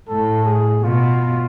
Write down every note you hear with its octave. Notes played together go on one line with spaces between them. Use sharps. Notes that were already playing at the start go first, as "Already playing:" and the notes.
A2 A4
G#4
B2 F4